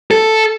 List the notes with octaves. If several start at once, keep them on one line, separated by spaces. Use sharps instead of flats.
A4